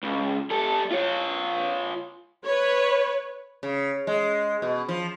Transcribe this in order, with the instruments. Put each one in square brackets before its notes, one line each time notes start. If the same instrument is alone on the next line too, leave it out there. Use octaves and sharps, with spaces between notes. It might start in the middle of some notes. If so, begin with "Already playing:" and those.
[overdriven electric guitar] C#2
G3 A4
F4 C#5
[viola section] B4 C#5
[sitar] C#3
G#3
B2
F3